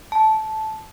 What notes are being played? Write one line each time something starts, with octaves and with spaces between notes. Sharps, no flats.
A5